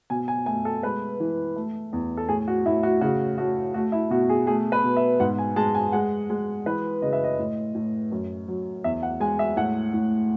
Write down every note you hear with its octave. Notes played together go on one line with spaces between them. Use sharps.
B2 G#5
G#5
A3 G#5
A4
G#3 B4
E3
A3
E2
A4
A2 G#4
F#4
A2 E4
F#4
C#3 F#4
A3 F#4
A3 F#4
E4
B2 F#4
G#4
A3 G#4
B4
B2
E5
G#2 F#5
G#5
G#3 A5
G#5
G#3 F#5
G#3
E3 B4
C#3 D#5
E5
D#5
A2
A2
F#2
F#3
E2 E5
F#5
G#3 G#5
E5
A2 F#5
A2